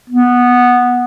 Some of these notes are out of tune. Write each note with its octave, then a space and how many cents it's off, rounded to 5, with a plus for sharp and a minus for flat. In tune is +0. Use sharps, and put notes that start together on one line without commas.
B3 -5